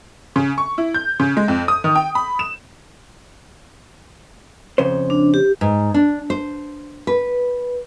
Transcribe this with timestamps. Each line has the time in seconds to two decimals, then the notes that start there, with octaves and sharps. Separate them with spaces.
0.36 C#3
0.58 C#6
0.78 E4
0.94 G6
1.20 C#3
1.37 G#3
1.48 F2
1.68 D#6
1.84 D#3
1.95 G5
2.15 B5
2.39 E7
4.78 F2 C#3 C5
5.10 D4
5.34 G4
5.61 G#2
5.94 D4
6.30 C5
7.07 B4